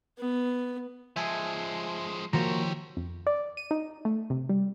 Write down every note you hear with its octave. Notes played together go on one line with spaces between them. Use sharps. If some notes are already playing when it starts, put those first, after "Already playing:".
B3
F3 G#3 E5 G#5 A5
D#3 F3 A#3 F#4 G4 C5 C#5 A#5
F2
D5
D#7
D#4
A3
C3
G3